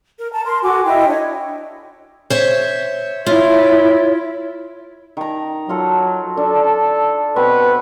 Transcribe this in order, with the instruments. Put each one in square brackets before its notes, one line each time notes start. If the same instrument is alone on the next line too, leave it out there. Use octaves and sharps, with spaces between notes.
[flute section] A#4
A5 A#5
A#4 C6
F#4 A4 G#5 D6
E4 D#5 G5
D4 C#5
[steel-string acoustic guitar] C5 C#5 E5
[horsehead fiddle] E4 [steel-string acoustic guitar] F4 [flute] C#5
[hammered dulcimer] D#3 A#5
[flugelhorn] F#3 [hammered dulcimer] F4 A4
[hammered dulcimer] D4 [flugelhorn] A4
[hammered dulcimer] B2 C4 C#6 [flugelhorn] B4